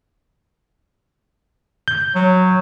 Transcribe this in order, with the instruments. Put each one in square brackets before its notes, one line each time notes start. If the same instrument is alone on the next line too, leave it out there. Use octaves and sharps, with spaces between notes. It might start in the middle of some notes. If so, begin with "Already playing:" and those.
[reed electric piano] G6
[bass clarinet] F#3